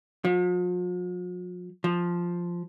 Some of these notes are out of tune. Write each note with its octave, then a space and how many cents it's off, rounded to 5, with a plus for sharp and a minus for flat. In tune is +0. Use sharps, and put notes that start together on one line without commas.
F3 +45
F3 +0